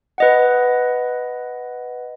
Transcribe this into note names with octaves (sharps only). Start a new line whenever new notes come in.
B4 D#5 F#5